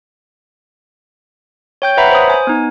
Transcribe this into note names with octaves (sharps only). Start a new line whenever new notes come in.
C#5 G5 G6
B4 C#5 E5 F#5 A#5 B5
C5 D#6
G#5
B3 D#4